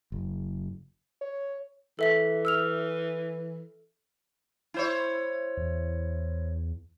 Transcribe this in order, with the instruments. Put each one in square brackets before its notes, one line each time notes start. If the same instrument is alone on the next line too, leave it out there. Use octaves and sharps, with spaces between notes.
[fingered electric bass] F#1
[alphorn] C#5
[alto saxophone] E3 [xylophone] A4 E5 B6
[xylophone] E6 F6 F7
[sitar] E4 C5 C#5
[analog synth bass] E2